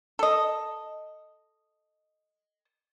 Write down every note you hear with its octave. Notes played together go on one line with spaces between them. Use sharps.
A4 D#5